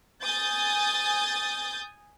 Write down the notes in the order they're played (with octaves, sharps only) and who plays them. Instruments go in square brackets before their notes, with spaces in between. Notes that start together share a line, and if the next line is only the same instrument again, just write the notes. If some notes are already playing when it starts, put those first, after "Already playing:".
[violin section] G#5 D#6 G6 A6